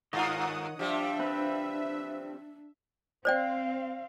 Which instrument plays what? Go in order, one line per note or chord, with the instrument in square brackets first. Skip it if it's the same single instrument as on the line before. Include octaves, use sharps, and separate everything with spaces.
[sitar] G2 F4 [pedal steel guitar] D#3 C#5 D#5 [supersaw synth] F#5 D#6
[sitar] F3 G3 [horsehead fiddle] D4 [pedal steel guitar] G4 [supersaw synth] E5
[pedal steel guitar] C4 B4
[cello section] C4 F5 [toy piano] C5 D5 G5